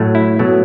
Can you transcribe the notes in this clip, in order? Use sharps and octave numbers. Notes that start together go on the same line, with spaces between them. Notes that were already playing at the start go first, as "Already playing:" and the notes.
Already playing: A2 F#3 A3
E4
B2 F#3 A3